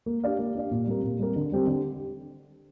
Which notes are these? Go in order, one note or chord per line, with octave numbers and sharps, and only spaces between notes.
A#3
D4 G4 D5 F5
A#3
D4 G4 D5 F5
A#2
G3 C4 G4 A#4
A#2
G3 C4 G4 A#4
D3
G3 C4 G4
D3